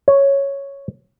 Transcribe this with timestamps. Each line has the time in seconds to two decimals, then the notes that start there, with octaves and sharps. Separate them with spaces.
0.08 C#5